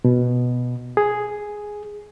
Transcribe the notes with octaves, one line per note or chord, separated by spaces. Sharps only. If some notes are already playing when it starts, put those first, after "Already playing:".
B2
G#4